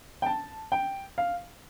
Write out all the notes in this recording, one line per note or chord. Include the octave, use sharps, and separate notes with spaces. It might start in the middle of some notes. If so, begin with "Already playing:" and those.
G5
A5
G5
F5